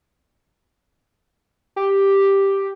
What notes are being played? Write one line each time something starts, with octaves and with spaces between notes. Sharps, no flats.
G4